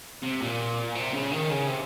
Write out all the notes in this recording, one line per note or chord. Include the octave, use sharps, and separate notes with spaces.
C3
A#2
C3
C#3
D#3
C#3
C3